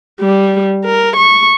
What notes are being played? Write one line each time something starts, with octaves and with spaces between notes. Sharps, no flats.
G3
A#4
C#6